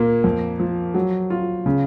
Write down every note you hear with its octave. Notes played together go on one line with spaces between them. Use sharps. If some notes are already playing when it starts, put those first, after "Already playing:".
Already playing: A#2 A#3
F2
F3
F#3
F4
C#3